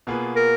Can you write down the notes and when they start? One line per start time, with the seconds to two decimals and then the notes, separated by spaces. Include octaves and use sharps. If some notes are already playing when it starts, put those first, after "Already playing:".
0.07 B2 A#3 F4 G#4 B4
0.36 A#4